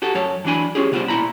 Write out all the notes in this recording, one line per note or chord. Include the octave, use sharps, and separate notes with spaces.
F#4 G4 A4
F#2 F#3 C#5 A5
E3 F#3 D4 G#5 B5
C#4 F4 G4 G#4
C3 G3 B3 F4 C5
B1 A#2 E4 A#5 B5